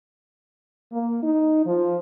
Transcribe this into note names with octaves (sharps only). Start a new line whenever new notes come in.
A#3
D#4
F3